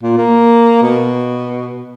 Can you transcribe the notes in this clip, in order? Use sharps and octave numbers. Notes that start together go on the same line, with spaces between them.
A#2
A#3
B2